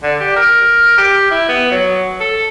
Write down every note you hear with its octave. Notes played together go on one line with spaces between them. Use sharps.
D3
G4
A#4
G4
E4
B3
F#3
A4